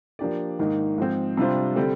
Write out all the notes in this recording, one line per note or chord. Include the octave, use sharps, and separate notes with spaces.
F3 A#3 D4 G4 D5
G#2 D#3 A#3 D#4
G#2 F3 C4
C3 G3 D4 F4 C5
D3 G3 C4